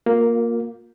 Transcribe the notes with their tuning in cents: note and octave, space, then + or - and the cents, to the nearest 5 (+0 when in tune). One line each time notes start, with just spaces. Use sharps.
A#3 +0 F4 +30